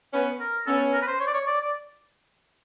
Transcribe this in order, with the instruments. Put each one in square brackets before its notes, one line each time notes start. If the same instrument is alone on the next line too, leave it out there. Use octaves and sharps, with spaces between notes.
[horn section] B3 C#4
[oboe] A#4
[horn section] B3 C#4 [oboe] A4
[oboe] A#4
B4
C5
C#5
D5
C#5
D5
D5